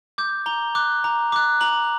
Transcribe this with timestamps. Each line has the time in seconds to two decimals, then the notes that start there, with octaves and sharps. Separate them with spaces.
0.18 D6 G6
0.46 A#5 G7
0.75 D6 F#6
1.04 A#5
1.32 D6 F#6
1.61 A#5 F#7